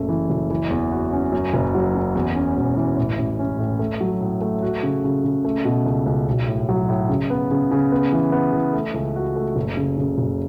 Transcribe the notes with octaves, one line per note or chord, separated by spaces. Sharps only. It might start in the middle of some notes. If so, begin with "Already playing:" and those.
Already playing: F#1 C#3 A3
E3
F#1
E3
E2
F#4
C#4
F#2
F#1
F#3
F#2
E2
C#4
E1
E3
A1
A1
C#4
A2
A3
F#3
A2
A3
F#4
C#3
C#3
C#3
A3
B2
C#2
C#2
B1
A2
F#3
A2
C#3
B3
C#3
C#3
B3
E3
B3
E3
A3
C#2
F#4
A3
F#1
C#3
C#3
F#1